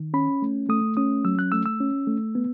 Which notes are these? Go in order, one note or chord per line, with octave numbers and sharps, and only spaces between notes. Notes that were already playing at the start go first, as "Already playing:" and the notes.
Already playing: D#3
C#4 B5
A3
A3 D#6
C#4 D#6
F#3 E6
F#6
A3 E6
E6
C#4
A3
B3